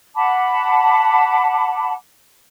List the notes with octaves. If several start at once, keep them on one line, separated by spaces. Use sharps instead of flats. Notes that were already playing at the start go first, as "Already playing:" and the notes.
F#5 A5 B5 D6